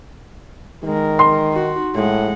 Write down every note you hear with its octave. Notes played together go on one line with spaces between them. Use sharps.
D#3 G#3 A#4
C6
D#4 F#4
A2 G#3 F#5